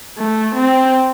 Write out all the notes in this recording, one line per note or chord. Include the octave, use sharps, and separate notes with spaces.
A3
C4